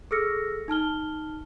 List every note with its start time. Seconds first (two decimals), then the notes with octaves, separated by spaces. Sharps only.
0.11 G#4 A4 E6 F6 A#6 C#7
0.68 D#4 A5 F6 G7